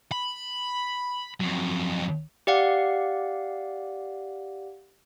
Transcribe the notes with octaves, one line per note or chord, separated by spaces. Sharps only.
B5
F2 F#3
G4 D5 F5 F#5